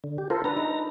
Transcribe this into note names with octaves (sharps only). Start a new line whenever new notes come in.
D3
G4
F4 A4 A#4 C5
D4 B4 A#5
D#4